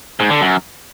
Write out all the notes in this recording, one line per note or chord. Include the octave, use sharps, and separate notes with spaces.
G#2
D3
F#2